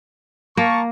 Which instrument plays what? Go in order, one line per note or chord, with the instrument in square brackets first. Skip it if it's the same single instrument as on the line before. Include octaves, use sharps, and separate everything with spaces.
[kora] A#3 [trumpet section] A#4 A5 C#6